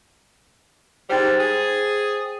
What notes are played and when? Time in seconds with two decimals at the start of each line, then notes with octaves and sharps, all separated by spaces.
1.10 G#2 G3 C5 G5 A6
1.39 G#4